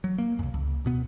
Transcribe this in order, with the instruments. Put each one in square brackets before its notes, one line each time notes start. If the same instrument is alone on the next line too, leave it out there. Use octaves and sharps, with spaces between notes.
[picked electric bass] F#3
A#3
C2 F2
C#2
D1 B2 B3